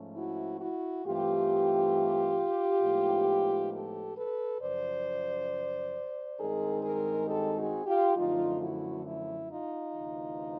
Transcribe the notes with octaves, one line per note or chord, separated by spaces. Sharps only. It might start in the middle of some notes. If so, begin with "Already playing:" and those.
Already playing: G#2 F3 A3 C#4
E4 F#4
E4 F#4
G2 E3 A3 C4 F4 G4
A2 F3 G#3 B3 D#4
G4 A4
A4 B4
F#2 C#3 F3 C5 D5
G2 D#3 G#3 C4 D#4 G#4 A#4
G#4 A#4
G4 A4
F#4 G#4
F4 G4
F#2 D3 F3 A3 D#4 F4
E4 F#4
E4
D#4 F4
D2 C3 E3